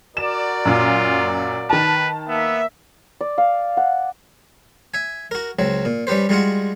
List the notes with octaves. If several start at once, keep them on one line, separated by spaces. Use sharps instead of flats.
F#4 A#4 D5 E7
F#2 A#2 F4
D#3 B4 A5
A#3 B3 E5
D5
F5
F#5
E5 G#5
F#4 A#4
C#2 F#3 C4
A#2
G3 C#4 G4 B4 C5
G3 G#3 F4 F#4 F#5